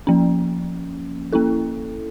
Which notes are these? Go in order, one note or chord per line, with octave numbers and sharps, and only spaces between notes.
F3 A#3 C#4
A#3 C#4 E4 A4